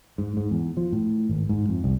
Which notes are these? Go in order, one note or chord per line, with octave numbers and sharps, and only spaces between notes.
G#2
G#2
E2
F3
A2
G#1
G#2
F2
C2